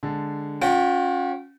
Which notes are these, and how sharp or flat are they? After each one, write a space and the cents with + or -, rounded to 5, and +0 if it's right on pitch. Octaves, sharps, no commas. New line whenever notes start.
D3 +0 G#3 -5 A5 +0
C#4 +0 F4 +45 G5 -35